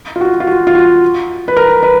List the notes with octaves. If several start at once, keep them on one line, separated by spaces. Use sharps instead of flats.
F4
F#4
F4
F#4
F4
F#4
B4
A#4
B4